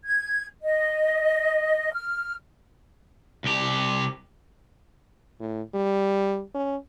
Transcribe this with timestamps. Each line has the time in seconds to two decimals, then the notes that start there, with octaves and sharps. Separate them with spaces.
0.04 G#6
0.63 D#5
1.93 F6
3.44 C2 G4
5.40 A2
5.74 G3
6.54 C#4